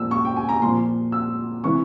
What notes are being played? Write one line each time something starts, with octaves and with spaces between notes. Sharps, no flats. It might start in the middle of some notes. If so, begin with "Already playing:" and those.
Already playing: A#2 F3 E6
C#6
G5
G#5
A#5
A#2 F3 C6
E6
C3 E3 C#6